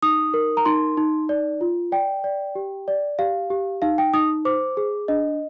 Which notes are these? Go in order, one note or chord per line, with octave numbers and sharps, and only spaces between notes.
D#4 D#6
A#4
A#5
D#4 C6
D#4
D5
F4
D5 G5
D5
G4
D5
G4 F5
G4
D#4 F5
G5
D#4 D#6
C5 D6
G#4
D4 D#5